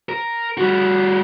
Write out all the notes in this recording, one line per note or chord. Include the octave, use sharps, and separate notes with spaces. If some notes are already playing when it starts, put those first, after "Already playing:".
A#4
G3 F#4